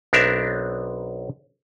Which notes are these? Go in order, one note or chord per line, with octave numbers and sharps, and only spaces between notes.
B1 B3 C4 D4 A#4 E5